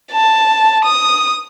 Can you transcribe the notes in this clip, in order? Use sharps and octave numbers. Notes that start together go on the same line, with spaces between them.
A5
D#6